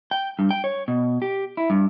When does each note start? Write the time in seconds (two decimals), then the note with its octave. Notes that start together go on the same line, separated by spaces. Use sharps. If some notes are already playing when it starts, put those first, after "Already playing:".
0.11 G5
0.39 G2
0.51 G5
0.64 C#5
0.88 B2
1.22 G4
1.57 E4
1.70 G2